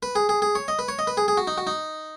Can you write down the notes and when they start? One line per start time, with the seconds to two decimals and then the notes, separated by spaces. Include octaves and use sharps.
0.03 B4
0.15 G#4
0.29 G#4
0.42 G#4
0.55 C#5
0.68 D#5
0.79 B4
0.88 C#5
0.99 D#5
1.07 B4
1.17 G#4
1.28 G#4
1.37 F#4
1.47 D#4
1.58 F#4
1.67 D#4